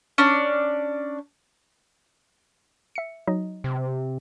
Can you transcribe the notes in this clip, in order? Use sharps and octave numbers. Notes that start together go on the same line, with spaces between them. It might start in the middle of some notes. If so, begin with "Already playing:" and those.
C#4 D4 D5
E5 C#7
F#3 D#4 D#5
C3